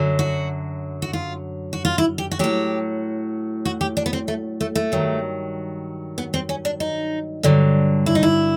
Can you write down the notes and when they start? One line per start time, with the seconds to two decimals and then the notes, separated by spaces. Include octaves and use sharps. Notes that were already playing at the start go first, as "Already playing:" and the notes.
Already playing: F#2 D3 F#3
0.19 F#4
1.02 F#4
1.13 F4
1.73 F#4
1.85 F4
1.98 E4
2.18 G4
2.31 F#4
2.39 A2 F#3 G4
3.65 F#4
3.81 G4
3.97 D4
4.06 B3
4.13 C4
4.28 A3
4.61 A3
4.75 A3
4.92 G2 D#3 F#3
6.18 B3
6.34 C4
6.49 C#4
6.65 D4
6.80 D#4
7.43 G2 D3 F#3
8.06 E4
8.15 D#4
8.23 E4